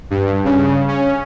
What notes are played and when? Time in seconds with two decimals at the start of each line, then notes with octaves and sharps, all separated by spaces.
0.11 G2
0.45 C#3
0.88 C#4